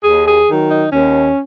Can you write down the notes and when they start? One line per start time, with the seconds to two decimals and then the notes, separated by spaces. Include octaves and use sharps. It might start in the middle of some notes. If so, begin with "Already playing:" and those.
0.04 D#2 G#4
0.26 G#4
0.48 D#3 F#3
0.71 D#4
0.93 D#2 C#4